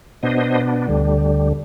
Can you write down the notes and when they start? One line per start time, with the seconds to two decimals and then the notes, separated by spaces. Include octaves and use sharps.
0.23 B2 B3 D4 C5 D#5
0.88 D2 D3 G3